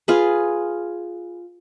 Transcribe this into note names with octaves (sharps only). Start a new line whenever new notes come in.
F4 G#4 B4